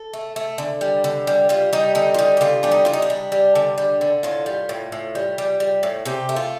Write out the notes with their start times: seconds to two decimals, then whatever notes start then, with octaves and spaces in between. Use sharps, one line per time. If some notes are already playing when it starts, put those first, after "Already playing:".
Already playing: A4
0.13 A3
0.36 A3
0.58 D3
0.81 G3
1.04 D3
1.27 G3
1.49 G3 F4
1.73 G3 D#4
1.95 D3 D#4
2.14 F4
2.19 G3 D#4
2.37 G4
2.41 D3 F4
2.63 G3 D4
2.71 D#4
2.85 G3 F4
2.93 D#4
3.02 D4
3.10 G3
3.32 G3
3.55 D3
3.78 G3
4.01 D3
4.23 A2 F4
4.46 G3
4.69 A2
4.92 A2
5.15 G3
5.38 G3
5.60 G3
5.83 A2
6.05 C3 G4
6.29 A3
6.36 F4